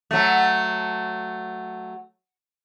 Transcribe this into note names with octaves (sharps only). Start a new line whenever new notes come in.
F#3 A3